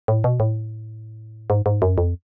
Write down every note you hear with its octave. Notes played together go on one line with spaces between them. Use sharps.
A2
B2
A2
G#2
G#2
F#2
F2